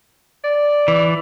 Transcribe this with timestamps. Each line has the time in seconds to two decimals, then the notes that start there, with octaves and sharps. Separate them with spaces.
0.44 D5
0.88 E3